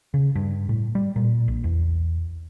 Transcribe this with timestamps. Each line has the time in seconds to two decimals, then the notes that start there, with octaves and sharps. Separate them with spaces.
0.14 C#3
0.35 G2
0.69 A2
0.95 G3
1.16 A#2
1.48 A#1
1.64 E2